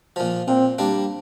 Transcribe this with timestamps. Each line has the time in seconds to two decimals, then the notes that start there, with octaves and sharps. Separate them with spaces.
0.16 A#2 F3
0.47 A#2 C4
0.78 G3 A#3 D4